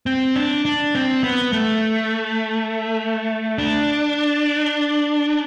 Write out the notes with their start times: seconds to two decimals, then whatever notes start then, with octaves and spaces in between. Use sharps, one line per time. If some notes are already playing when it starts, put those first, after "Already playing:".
0.06 C4
0.36 D4
0.65 D4
0.95 C4
1.23 B3
1.53 A3
3.58 D4